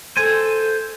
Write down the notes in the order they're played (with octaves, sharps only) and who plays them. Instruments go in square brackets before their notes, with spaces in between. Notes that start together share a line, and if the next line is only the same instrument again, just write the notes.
[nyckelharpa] A4 [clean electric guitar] C5 G#5